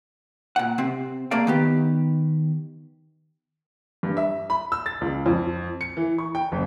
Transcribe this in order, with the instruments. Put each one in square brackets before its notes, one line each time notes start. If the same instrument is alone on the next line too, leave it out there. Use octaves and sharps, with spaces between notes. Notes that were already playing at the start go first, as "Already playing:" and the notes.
[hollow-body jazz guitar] A#2 F#5
C3 C4
A3 A#3 G#4 D5 F5
D#3 B3 G4
[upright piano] G2
E5
B5
E6
A6
C#2
F2
C#7
E3
C#6
G5
F#1